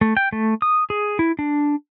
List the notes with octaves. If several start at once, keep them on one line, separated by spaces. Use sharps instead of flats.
A3
G5
A3
D#6
G#4
E4
D4